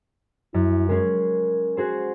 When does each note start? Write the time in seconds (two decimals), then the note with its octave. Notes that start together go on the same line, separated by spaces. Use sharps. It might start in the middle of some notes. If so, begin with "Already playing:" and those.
0.54 F#2 E4
0.89 G#3 C#4 G#4 A#4
1.77 F#4 G#4 C5